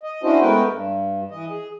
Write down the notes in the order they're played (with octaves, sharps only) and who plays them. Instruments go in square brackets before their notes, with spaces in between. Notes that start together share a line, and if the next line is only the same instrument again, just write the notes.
[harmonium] D#5
C#4 D4 E4 F#4 C5 D#5
G#3 A3 B3 A#4 B4 G5
G2
E3 D#5
G#4